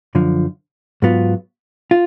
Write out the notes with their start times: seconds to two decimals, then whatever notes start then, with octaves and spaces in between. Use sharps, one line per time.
0.15 F#2 D3 F3
1.02 G#2 F#3 B3 F4
1.91 F4